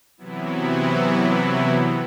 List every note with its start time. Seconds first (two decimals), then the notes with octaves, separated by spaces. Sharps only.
0.17 C3 E3 F#3 B3 E4